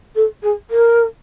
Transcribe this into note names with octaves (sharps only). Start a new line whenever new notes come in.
A4
G#4
A#4